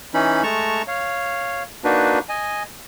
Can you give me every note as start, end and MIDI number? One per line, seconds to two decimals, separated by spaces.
0.14 0.43 52
0.14 0.43 61
0.14 0.43 63
0.14 0.43 83
0.43 0.82 56
0.43 0.82 57
0.43 0.82 81
0.43 0.82 82
0.43 0.82 85
0.88 1.63 73
0.88 1.63 77
1.84 2.19 58
1.84 2.19 62
1.84 2.19 63
1.84 2.19 66
1.84 2.19 71
2.29 2.63 75
2.29 2.63 80